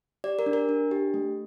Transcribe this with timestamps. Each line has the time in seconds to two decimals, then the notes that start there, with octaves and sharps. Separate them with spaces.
0.24 G4 D5
0.39 A#4
0.46 D4
0.53 A#4
0.69 D4
0.91 G4
1.14 A3